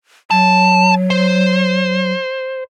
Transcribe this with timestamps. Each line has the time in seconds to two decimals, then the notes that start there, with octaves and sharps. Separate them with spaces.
0.31 F#3 A5
1.10 C5